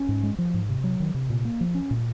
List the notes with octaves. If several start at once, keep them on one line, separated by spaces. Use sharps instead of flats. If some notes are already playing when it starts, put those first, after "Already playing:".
Already playing: C#4
G#2
G#3
F3
G#2
C3
F#3
D#3
C3
A#2
A#3
F3
C#4
A#2